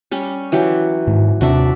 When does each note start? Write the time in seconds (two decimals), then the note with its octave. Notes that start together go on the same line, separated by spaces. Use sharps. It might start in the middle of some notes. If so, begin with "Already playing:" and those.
0.11 G3 C#4
0.52 E3 F#3 G4
1.07 G#2 D#3
1.41 D#2 C3 D4 F#4 D5 E5